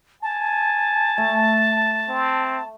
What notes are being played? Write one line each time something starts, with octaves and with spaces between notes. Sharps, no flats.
G#5 A5
A3
C4